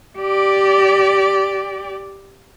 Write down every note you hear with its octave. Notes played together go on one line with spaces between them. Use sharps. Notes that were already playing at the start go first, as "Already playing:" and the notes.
G4 D5